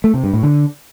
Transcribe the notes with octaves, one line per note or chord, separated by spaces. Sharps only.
A3
C3
G2
A2
D3